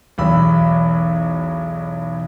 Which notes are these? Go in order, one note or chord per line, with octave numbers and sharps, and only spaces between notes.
B1 E2 B5 E6